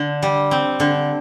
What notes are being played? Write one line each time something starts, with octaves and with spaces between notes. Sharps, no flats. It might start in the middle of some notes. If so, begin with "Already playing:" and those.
Already playing: D3
G3
C4
D3